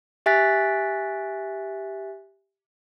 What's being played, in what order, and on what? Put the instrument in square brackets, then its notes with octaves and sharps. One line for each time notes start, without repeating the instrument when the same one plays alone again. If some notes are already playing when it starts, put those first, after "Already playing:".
[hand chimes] G4 E5 G#5 F#6 A6 B6